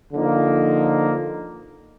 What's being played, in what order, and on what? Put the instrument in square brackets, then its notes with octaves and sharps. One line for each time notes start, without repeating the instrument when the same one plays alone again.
[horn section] D3 F3 A#3 D#4